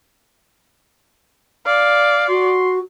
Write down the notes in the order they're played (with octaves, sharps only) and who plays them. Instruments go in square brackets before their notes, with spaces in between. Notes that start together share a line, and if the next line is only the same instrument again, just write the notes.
[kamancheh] D5 [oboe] F5
[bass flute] F#4 [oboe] C6